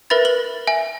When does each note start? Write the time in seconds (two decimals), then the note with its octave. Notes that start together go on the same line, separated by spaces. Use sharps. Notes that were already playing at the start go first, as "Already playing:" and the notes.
0.10 A#4 B4 E5 B5 A6
0.25 B4 F#7
0.67 E5 G#5